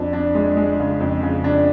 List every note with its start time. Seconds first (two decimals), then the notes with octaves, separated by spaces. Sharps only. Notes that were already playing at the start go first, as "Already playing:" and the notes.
Already playing: F2 D4
0.13 D4
0.35 G#3
0.57 G#3
0.79 C#3
1.00 F2
1.23 C#3
1.44 D4